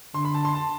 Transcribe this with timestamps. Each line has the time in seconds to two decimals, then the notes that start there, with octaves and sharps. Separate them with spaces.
0.14 D3 C6
0.25 B5
0.34 A5
0.45 C6
0.55 A5